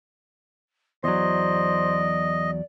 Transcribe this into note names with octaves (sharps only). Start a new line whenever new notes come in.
E2 F#3 C5 D5 D#5